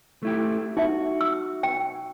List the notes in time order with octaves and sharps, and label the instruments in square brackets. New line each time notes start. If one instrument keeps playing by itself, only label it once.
[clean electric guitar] A3 E4 G4
[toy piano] D#4 E5 [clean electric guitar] F#4
[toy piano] E6
G5